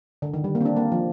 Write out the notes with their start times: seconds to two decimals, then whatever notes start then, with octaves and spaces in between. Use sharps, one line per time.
0.22 D3
0.34 D#3
0.44 G3
0.55 A#3
0.61 C4
0.65 D4
0.77 A#3
0.92 F3